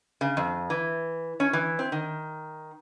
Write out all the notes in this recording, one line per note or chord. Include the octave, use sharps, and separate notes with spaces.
C#3
F2
E3
C#4
E3
C4
D#3